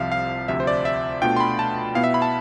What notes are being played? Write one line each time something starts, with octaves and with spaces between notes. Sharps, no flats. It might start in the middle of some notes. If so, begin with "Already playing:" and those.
Already playing: C2 C3 F3 E5 F5
F5
D2 C3 F3 E5
C5
D5
E5
B2 A3 D4 F4 G5
C6
B5
A5
B2 B3 E4 F5
E5
B5
A5